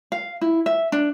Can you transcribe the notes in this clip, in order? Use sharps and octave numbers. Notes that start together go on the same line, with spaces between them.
F5
E4
E5
D4